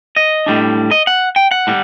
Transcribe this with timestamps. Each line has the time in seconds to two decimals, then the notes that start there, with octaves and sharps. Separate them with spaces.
0.16 D#5
0.46 A2 G3 D4
0.91 D#5
1.07 F#5
1.36 G5
1.51 F#5
1.67 A2 G3